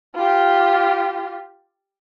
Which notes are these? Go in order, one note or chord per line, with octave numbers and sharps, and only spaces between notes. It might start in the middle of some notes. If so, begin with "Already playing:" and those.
F4 G4